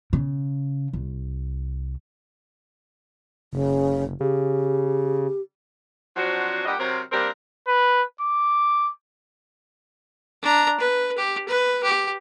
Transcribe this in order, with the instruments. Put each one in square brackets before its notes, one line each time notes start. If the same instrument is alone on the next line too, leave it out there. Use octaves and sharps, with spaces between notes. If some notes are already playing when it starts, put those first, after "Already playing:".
[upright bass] C#3
C2
[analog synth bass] F#1 [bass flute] C#3
[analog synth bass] C#3 [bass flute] G4
[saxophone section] F3 F#3 C4 D4 F#4
G2 A#2 G3 G4 D#5 F#5
C3 F#3 C4 A#4
G3 A#3 C4 D4 A#4
[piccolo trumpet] B4
D6
[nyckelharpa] D4 A#5
B4
G4
B4
G4